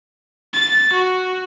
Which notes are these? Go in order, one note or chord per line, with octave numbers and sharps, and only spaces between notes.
A6
F#4